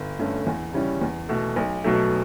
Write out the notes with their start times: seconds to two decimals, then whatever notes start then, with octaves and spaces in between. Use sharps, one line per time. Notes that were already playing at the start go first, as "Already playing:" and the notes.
Already playing: G1
0.19 G2 D3 A3 C#4
0.47 E2
0.74 C#3 G3 C#4 E4
1.01 E2
1.29 B2 A3
1.56 B1
1.84 B2 F#3 A3